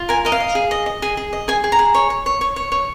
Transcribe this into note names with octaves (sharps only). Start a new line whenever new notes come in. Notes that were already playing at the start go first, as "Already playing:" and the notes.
Already playing: F4
A#4 G#5
A#4 D#5
F5
D#5
G#4
D#5
D#5
G#4
G#4
D#5
G#4 G#5
G#4
A#5
G#4
C#5
C#5
C#5
C#5
C#5
C#5